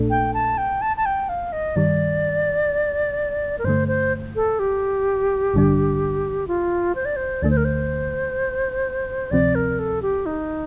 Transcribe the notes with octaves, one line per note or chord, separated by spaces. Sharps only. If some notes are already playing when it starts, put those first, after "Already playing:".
Already playing: A#1 A#2 A3 D4 A4
G5
A5
G5
A5
A5
G5
F5
D#5
G2 D#3 G3 D5
A#4
G2 D3 A3 C5
C5
A4
G4
A1 G2 D3 G3 D4
F4
C5
D5
C5
D2 D3 A3 D5
C5
A#4
C5
D2 C3 F3 C4 D5
A#4
A4
G4
D#4